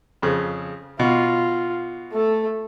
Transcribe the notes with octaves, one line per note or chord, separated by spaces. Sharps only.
F2 C#3
B2 F4
A3 A4